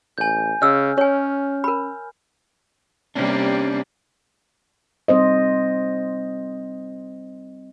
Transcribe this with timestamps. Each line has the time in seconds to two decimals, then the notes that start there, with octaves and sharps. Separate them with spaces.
0.18 A1 G#5 G6
0.62 C#3 D#5 E6 F6
0.98 C#4 C#5 G#5
1.64 A#4 B5
3.15 C3 G3 A#3 C#4 D4
5.08 G3 C4 C5 D#5